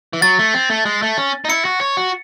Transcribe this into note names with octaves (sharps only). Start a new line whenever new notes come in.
E3
F#3 A6
A3
C4
A3
G#3
A3
C#4
D#4
E4 C#7
F#4
C#5
F#4